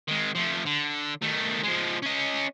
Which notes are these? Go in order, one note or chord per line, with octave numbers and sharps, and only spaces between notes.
D#3 G#3
F3 A3
D3
D#3 A3
F3 G#3
C#4 D#5